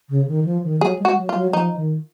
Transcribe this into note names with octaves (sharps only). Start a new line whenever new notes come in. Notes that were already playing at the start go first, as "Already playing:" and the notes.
C#3
D#3
F3
D#3
F#3 G#4
G#3
F#4
F#3
F4
F#3
F3 D#4
D#3